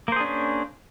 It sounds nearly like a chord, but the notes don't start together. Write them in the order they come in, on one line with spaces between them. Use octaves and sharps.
A#3 C5 G#4 D4 C#4